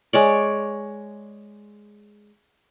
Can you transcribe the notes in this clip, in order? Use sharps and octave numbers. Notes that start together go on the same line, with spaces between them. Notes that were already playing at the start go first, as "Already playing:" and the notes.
G#3 C#5 D5